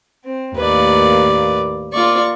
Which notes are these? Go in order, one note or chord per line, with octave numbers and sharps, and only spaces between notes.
C4
D#2 A2 A#3 B4 D5
A#3 F4 D5 C#6